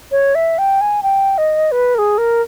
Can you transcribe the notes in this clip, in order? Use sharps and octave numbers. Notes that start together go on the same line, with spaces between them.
C#5
E5
G5
G#5
G5
D#5
B4
A#4
G#4
A#4